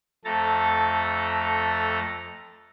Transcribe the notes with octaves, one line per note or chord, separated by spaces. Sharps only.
F2 A3 A4 A#5 A6